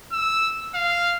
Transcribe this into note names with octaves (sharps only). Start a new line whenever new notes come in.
E6
F5